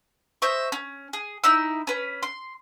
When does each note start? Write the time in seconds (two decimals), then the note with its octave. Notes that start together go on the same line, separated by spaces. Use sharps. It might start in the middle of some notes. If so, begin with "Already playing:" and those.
0.42 C5 D#5 E5 C#6
0.72 C#4
1.13 G#4
1.44 D#4 E4 E6
1.87 C#4 B4
2.23 C6